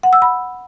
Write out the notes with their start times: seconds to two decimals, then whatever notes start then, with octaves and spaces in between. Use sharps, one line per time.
0.03 F#5
0.13 E6
0.22 B5